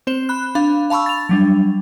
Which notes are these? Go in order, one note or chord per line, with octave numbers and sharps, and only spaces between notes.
C4 C5 E7
B5 F#6
D4 F5 B5
F5 A5 B5 C#6 E6
A6 F7
F#3 G3 D4